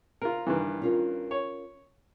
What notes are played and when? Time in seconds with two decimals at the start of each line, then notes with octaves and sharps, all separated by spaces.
0.22 C4 F4 A#4
0.47 G2 D#3 E3
0.82 C#4 F4 A#4
1.31 C#5